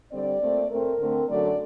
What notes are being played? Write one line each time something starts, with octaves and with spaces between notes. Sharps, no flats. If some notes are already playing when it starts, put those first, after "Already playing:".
D3 G3 C4 D5
A#2 A3 C4
A2 A3 C4 A#4
D3 A3 C4
F#2 D3 F#3 A3 D5